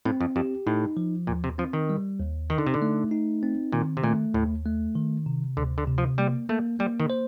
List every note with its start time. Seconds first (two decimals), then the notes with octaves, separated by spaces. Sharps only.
0.05 A2 C4
0.21 F2
0.36 F2 G4
0.67 A2 D#4
0.97 F3
1.27 D#2 A#2
1.44 C3
1.58 F3 C4
1.73 D#3
1.89 G3
2.19 D#2
2.50 D#3 D#4
2.58 D3
2.67 C3
2.74 D3
2.82 A3
3.11 D#4
3.43 C4
3.72 A#2 D#3
3.97 C3
4.03 A#2 A3
4.34 D#2 A2
4.66 A3
4.96 D#3
5.26 C3
5.57 D2 D3
5.78 D3
5.87 C3
5.98 F3
6.18 G3 A#3
6.49 A3 A#3
6.79 G3 A#3
7.00 D#3
7.10 C5